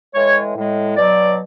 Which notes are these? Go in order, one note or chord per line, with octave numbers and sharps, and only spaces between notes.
A2 E3 G#3 C#5
A2 G#3
B2 F#3 D5